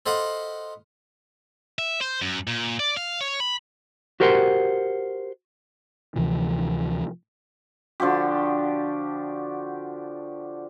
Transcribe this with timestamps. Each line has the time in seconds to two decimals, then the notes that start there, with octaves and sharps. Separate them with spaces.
0.06 A4 C5 D#5 F5 F#5 B5
1.79 E5
2.01 C5
2.21 F#2
2.47 A#2
2.80 D5
2.97 F5
3.21 C#5
3.40 B5
4.20 F#4 G4 A#4 C5 F#5 C6
6.16 D2 C3 E3 F3
8.00 D3 F3 F#4 G4